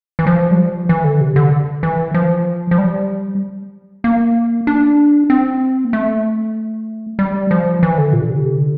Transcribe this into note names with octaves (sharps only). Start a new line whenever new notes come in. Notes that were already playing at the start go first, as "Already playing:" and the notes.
E3
F3
G3
F3
E3
D3
C3
D3
E3
F3
F3
G3
A#3
D4
C4
A#3
A3
G3
F3
E3
D3
A#2
D3
C3
D3